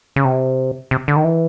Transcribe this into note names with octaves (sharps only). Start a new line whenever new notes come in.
C#3
C3
C3
D3
D#3
E3